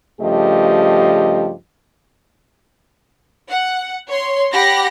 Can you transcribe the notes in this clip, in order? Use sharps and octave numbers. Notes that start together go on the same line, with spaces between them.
G2 C#3 F3 A3 G4 D#5
F#5
C#5 C6
G4 F#5 B5 A#6